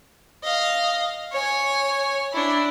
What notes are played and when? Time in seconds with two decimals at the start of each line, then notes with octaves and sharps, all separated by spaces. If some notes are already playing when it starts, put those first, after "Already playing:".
0.43 D#5 F5
1.32 C#5 G#5
2.33 D4 E4